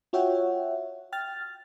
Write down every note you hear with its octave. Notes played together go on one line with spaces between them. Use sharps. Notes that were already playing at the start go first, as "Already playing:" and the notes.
F4 F#4 C#5 E5 F#5 G5
G5 F6 A6